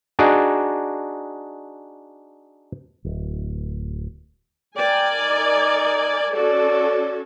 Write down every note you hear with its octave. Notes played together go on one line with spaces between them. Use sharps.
D4 D#4 F#4 G#4 D5
D1
A#4 D5 G5 G#5
D#4
C#4 F#4 A4 D5